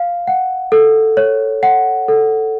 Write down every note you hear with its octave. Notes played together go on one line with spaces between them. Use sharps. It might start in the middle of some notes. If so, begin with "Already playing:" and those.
Already playing: F5
F#5
A4
C#5
F#5
A4